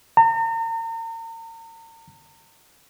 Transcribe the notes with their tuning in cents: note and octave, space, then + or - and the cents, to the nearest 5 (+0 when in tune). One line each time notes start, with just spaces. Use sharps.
A#5 -40